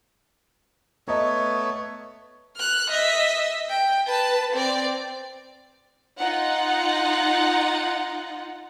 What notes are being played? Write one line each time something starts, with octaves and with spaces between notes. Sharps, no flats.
A3 B3 C#5 D#5 A#5
F6 F#6
D#5 E5
G5
B4 A5
C4 D5
D#4 F4 F#5